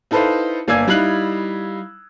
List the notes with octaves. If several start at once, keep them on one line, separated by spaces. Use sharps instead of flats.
D#4 E4 A4 B4 C5 F5
G1 A#3 D5 G#5 E6 G#6
G3 D#4 E4 F5 F#6 F#7